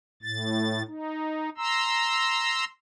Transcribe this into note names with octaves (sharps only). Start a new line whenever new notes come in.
A2 A6
D#4
A#5 C6 E6